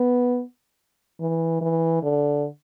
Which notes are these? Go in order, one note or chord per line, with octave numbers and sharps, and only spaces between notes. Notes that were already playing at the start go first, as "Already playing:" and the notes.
Already playing: B3
E3
E3
D3